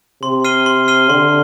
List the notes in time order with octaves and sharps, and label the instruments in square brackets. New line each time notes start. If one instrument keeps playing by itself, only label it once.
[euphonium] C3 [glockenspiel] C6
[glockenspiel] F6 C7 D#7 G7
C6
F6 C7 D#7 G7
[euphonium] D3 [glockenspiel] C6